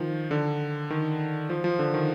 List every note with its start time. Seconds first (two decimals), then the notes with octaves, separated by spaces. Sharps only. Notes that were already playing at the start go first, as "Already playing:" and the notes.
Already playing: D#3 F3
0.31 D3
0.90 D#3
1.49 F3
1.64 F3
1.79 D3
1.94 D#3